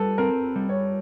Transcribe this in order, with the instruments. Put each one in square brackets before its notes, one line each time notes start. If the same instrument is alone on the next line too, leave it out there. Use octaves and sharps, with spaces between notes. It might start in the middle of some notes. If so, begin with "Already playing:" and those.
Already playing: [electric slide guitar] G3 [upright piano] A4 B4
[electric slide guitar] C4 [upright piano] A#4
[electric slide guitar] G3
[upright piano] C#5